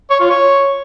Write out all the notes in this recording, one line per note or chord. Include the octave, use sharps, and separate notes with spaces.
C#5
F4
C#5